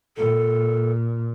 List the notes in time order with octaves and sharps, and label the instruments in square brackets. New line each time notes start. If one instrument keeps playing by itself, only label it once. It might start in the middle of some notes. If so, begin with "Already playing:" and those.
[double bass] A#2 [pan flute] A4